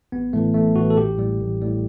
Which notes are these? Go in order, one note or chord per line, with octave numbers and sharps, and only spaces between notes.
A1 B3
A2 E3 A3
A1 A3
A2 E3 F#4
A4
A1 G4
A2 G3
A1
A2 G3